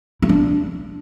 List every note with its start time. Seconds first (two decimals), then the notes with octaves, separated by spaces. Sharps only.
0.22 E4
0.29 D4